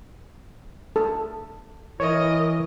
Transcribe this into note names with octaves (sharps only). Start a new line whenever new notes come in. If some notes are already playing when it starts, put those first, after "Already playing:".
A4
E3 A#4 C#5 D#5